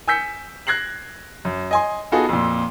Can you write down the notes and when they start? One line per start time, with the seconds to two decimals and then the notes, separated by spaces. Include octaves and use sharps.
0.08 G#5 E6 G6 B6 C#7
0.67 F#6 G#6 A#6 C7 F#7
1.45 F#2
1.71 D#5 G#5 C6
2.12 B3 D#4 F4 F#4 G#4 A4
2.29 F2 A#2